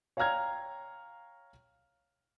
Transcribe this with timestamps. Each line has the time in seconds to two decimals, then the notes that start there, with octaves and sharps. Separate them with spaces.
0.17 C#5 F5 G5 A#5 F6 G#6